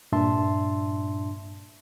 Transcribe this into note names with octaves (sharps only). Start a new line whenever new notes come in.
G2 A#2 D4 E5 A5 C6